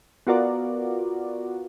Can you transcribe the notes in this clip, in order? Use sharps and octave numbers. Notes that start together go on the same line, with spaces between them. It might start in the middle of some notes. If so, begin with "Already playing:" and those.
B3 F4 F#4 A#4 D5